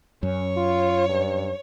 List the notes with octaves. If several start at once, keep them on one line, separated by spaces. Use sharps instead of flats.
F#2 C#4 C#5
F4
G2